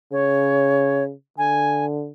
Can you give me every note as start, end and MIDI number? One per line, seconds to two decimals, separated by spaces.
0.12 1.13 49
0.12 1.04 73
1.38 2.12 50
1.38 1.85 80